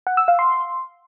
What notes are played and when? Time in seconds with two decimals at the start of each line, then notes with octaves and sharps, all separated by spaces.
0.07 F#5
0.17 E6
0.28 F5
0.39 C6